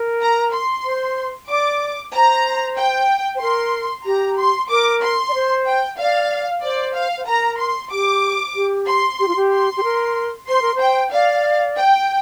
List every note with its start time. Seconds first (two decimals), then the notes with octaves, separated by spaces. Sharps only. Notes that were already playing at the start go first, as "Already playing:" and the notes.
Already playing: A#4
0.20 A#5
0.52 C6
0.85 C5
1.49 D5 D6
2.13 C5 A#5
2.77 G5
3.35 C5
3.41 A#4 C6
4.06 G4 A#5
4.38 C6
4.70 A#4 D6
5.02 C6
5.29 D5
5.34 C5
5.66 G5
5.98 D5 F5
6.63 C5 D5
6.95 F5
7.17 C5
7.27 A#4 A#5
7.59 C6
7.90 G4 D6
8.55 G4
8.87 C6
9.20 G4
9.28 F4
9.36 G4
9.52 C6
9.77 G4
9.83 A#4
10.48 C5 C6
10.62 A#4
10.75 C5 G5
11.12 D5 F5
11.77 G5